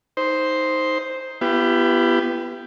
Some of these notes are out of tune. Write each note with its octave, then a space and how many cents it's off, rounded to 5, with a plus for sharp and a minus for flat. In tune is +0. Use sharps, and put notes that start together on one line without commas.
D#4 +15 C5 +0
B3 +0 E4 +45 G4 +0